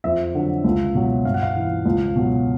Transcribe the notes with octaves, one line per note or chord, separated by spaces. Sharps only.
F2 E5
D3 F#3
C#2
B2 F#3
G2 F5
F#5
F5
E3
C#2
B2 F#3